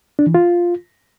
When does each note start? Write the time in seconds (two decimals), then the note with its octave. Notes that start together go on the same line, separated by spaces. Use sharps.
0.19 D4
0.27 E3
0.35 F4